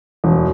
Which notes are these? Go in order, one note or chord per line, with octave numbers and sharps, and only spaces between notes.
E1